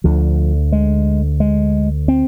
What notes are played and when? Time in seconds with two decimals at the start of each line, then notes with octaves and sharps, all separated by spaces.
0.04 D2 D3 F3
0.72 G#3
1.40 G#3
2.08 C4